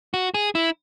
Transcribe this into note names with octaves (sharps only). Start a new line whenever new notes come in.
F#4
G#4
E4